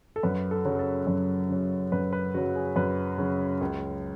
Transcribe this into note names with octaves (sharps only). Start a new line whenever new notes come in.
A4
F#2 B4
A4
C#3 F#3
A4
F#2
C#3 F#3
F#2 B4
B4
C#3 F#3 F#4
G#4
F#2 B4
C#3 F#3
C#2